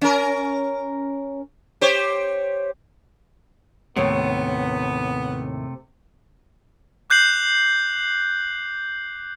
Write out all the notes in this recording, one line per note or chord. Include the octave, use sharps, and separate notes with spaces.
C#4 A#4
G4 C5 C#5
D#2 A2 C3 A3 B3 C#5
D6 F#6 G6 C7 F#7